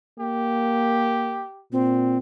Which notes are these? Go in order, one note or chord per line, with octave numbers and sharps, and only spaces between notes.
A#3 G4
A#2 C4